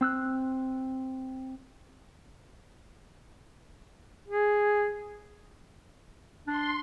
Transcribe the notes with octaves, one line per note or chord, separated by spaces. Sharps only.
C4 E6 F#6
G#4
D4 C6